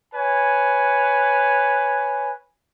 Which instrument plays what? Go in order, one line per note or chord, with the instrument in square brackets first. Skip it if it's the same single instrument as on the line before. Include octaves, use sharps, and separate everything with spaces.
[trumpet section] B4 C#5 G#5